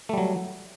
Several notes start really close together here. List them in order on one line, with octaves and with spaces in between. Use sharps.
A3 G3 F#3